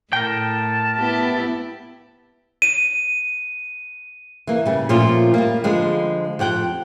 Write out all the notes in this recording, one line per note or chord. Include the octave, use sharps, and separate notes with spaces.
A2 A#4 G5 A5
B3 E4 G4
D#7
E3 A#3
C#3 G3
A#2 F3 A3 A#3 C#4 F4
G3 A#3
D3 F3 G3 G#3
F2 G4 F#5 G5